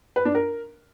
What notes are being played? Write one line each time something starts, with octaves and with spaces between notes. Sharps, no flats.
B4
D4
A#4